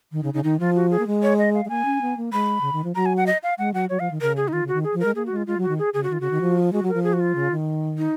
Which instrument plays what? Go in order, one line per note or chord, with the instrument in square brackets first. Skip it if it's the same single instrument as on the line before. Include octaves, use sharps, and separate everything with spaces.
[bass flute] D#3
[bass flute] C#3 [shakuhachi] D#4
[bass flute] C#3 [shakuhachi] D#4
[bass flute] D#3 [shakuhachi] D#4
[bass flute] F3 [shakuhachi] F4
[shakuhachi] F#4
G#4
[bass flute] A#3
G#3
[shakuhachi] C#5
D#5
F5
[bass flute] G#3
[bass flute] A#3 [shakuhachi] G#5
[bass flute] C#4
B3
A#3
[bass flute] G#3 [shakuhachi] B5
[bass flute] C#3
D#3
F3
[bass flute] F#3 [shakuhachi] A#5
[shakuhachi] G#5
F#5
D#5
F5
[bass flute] G#3 [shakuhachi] F#5
[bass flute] F#3 [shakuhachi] F#5
[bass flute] F#3 [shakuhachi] C#5
[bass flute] F3 [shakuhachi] F5
[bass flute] D#3
[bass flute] C#3 [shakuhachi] A#4
[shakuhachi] G#4
D#4
[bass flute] D#3 [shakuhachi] F4
[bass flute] C#3 [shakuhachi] F#4
[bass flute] D#3
[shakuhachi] G#4
[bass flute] F3
[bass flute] G#3 [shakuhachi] A#4
[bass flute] A#3 [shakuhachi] G#4
[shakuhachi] F#4
[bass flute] G#3 [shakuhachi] F4
[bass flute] G#3 [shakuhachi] F4
[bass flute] F#3
[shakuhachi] F#4
[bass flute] D#3
[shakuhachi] G#4
[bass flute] C#3 [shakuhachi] G#4
[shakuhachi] F#4
[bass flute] D#3 [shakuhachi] F4
[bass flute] C#3 [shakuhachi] F#4
[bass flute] D#3
F3
[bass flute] G#3 [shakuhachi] F#4
[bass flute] F#3
[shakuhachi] A#4
[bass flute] F3
[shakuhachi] G#4
F#4
F4
[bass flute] C#3
D#3
[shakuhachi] D#4